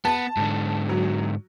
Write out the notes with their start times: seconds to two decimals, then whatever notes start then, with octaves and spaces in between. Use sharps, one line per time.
0.05 B3 B4 A5
0.37 G#2 D3
0.89 F#3